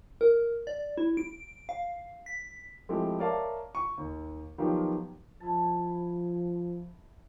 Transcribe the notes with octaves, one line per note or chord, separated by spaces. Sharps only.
A#4
D5
E4
D7
F5
B6
F3 G#3 A3 C4 E4 G4
A#4 C#5 D5 E5 F5 A5
C#6
D#2
D#3 F3 F#3 B3 F4 G4
F3 E4 A5